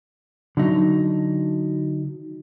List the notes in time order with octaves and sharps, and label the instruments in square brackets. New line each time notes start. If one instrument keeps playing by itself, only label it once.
[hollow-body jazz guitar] D3 F#3 D#4